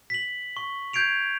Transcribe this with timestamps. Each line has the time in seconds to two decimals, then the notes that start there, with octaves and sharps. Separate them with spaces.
0.10 B6 F#7
0.57 C#6
0.93 G6 G#6 C7 D7 F7